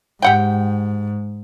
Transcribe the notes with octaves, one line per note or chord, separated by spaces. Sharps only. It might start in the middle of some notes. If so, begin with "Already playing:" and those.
G#2 G4 F#5 G5